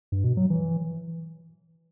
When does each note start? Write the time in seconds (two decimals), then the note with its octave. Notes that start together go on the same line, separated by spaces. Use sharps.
0.12 G2
0.24 B2
0.37 F#3
0.50 E3